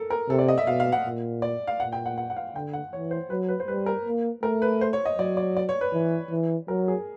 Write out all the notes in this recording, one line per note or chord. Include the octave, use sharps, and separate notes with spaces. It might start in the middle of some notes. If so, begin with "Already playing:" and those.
Already playing: A4 A#4
A#4
C3 A4
D5
D#5
E5
B2 F5
F5
F#5
A#2
D5
F5
A#2 F#5
G5
F#5
F#5
F#5
F5
D3 G5
F#5
E3 C#5
C5
F#3 B4
B4
C5
G3 B4
A#4
A#3
A3 A#4
B4
C5
C#5
D#5
F#3 D5
D5
D5
C#5
B4
E3
E3
F#3 A#4
G#4